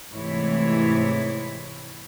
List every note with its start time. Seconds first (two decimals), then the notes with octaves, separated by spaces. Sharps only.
0.13 G#2 C3 E3 A3 E4 C#5